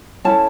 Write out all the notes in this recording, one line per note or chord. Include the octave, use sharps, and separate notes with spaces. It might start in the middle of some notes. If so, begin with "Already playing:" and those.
C#4 E4 A4 A5